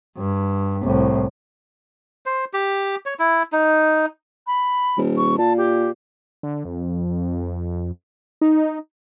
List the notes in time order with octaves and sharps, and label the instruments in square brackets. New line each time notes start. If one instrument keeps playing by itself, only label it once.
[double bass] G2
C2 A2
[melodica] C5
G4
C#5
E4
D#4
[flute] B5
[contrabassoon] D#1
[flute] C#6
[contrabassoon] A#2 [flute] A5
[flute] G4
[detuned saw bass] D3
F2
D#4